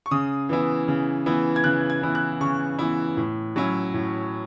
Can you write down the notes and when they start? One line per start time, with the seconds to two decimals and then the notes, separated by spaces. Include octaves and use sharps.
0.06 C#6
0.11 C#3 D#6
0.49 E3 B3 E4
0.88 C#3
1.26 E3 B3 E4
1.56 G#6
1.64 C#3 F#6
1.90 G#6
2.02 E3 B3 E4
2.15 F#6
2.41 C#3 C#6
2.79 E3 B3 E4
3.17 A2
3.56 F#3 C#4 E4
3.94 A2